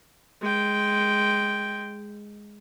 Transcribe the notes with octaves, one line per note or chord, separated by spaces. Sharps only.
G#3 G5